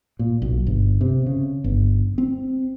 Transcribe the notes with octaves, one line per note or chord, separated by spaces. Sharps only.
A#2
B1
G1
C3
C#3
G1
C4